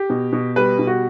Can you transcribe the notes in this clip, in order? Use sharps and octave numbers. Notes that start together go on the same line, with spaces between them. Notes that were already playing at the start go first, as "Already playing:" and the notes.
Already playing: G4
B2
B2
G3 B4
B2
F#4